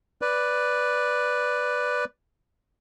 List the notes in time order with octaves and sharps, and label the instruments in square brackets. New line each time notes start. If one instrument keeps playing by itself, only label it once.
[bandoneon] B4 D5